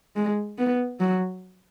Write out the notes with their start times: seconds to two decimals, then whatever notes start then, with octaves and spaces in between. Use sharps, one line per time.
0.16 G#3
0.58 B3
1.00 F#3